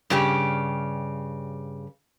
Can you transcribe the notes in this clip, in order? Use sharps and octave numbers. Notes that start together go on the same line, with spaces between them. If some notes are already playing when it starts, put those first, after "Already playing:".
G2 C#3 G4